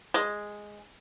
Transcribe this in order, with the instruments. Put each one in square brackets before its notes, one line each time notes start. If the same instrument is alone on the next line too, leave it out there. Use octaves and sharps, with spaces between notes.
[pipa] G#3